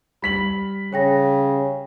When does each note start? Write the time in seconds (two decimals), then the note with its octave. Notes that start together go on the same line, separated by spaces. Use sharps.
0.22 G3 B5 B6 F#7
0.93 C#3 C#5 G5 A#6